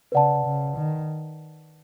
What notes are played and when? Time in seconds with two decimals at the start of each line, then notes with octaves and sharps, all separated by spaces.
0.12 C#3 B4 D5 F#5 A5
0.45 C#3
0.77 D#3